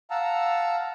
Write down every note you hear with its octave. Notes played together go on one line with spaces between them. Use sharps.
F5 F#5 A5 A#5 E6